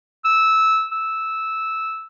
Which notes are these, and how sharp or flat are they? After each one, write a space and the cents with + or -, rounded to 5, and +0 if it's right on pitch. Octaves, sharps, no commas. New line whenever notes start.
E6 -15
E6 -10